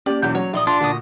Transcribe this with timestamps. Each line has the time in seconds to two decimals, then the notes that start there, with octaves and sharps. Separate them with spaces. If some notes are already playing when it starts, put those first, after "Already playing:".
0.06 A#3 C#4 G4 D5
0.22 B1 E2 G6
0.35 F#3 C#5
0.53 A#1 D#4 D5 E5 D#6 G7
0.67 D4 F4 F5 C6
0.81 D2 A#2 F#4 D#6